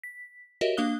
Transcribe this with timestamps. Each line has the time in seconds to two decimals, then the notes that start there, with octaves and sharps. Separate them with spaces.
0.03 B6
0.61 F#4 G4 A#4 C#5 D#5 E5
0.77 A#3 D4 F5 D#6 F#6 G7